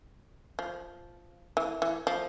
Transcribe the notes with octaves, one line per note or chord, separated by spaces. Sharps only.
F3
E3
E3
F3